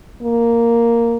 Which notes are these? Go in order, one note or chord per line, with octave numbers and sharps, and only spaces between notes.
A#3